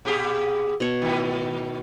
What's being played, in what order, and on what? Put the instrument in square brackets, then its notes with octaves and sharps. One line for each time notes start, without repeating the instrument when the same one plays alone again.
[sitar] A#2 G4 G#4
[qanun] B2 C#5 A5
[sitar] G#2 D#3